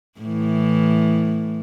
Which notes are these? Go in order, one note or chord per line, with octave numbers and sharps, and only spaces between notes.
A2 E3